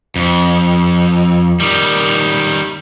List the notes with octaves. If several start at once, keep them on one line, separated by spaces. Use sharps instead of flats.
F2
D#3 G3